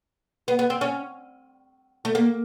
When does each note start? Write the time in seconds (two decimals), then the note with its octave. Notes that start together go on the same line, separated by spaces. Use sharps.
0.48 B3
0.59 B3
0.70 C4
0.81 C#4
2.05 A3
2.15 A#3